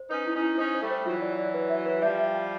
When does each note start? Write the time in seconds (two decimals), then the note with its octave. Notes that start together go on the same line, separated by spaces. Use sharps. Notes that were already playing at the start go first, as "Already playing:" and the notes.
Already playing: C5
0.10 C#4 D#4 B4
0.27 E4
0.34 C#4 D#4
0.42 E4
0.58 C#4 D#4 C5
0.75 C5
0.82 G3 A3
0.91 C5
1.06 E3 F#3 F4
1.22 D5
1.39 D5
1.54 B4
1.70 E5
1.86 B4
2.02 F3 G3 E5
2.19 E5
2.35 G5